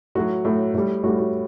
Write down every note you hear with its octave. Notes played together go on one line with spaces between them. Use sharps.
A2 F#3 F#4
A2 F#3
A2 G3
A2 G3 F#4
F#4